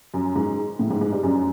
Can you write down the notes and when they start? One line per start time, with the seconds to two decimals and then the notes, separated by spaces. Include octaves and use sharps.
0.14 F#2
0.36 G#2
0.79 A2
0.91 G#2
1.01 G#2
1.12 G2
1.23 F#2